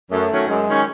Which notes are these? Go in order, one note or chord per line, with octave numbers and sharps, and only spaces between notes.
F#2 A3
D#3 F#3 C#4
F#2 G#3
D#3 F#3 C#4